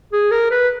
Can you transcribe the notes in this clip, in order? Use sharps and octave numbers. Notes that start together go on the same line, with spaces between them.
G#4
A#4
B4